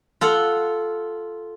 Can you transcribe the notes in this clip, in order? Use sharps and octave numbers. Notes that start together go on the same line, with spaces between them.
F4 A4 F#5